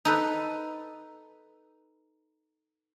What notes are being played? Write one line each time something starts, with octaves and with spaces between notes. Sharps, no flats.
D#4 A4 B4